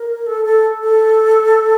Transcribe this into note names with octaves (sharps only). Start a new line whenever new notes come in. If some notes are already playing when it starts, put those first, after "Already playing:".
Already playing: A#4
A4
A4
A4